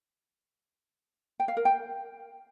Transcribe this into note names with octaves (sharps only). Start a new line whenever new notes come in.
G5
F5
A#4
G5